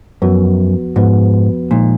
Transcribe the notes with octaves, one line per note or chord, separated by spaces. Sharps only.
F#2 F3 B3 F#4 B4
G#2 F3 B3 F#4 B4
A#2 F3 G#3 D#4